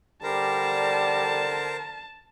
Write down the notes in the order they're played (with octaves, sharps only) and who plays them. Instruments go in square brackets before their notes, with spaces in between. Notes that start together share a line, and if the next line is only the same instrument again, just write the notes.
[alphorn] D3 [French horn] G3 [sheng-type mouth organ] A#4 C5 A#5 [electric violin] A5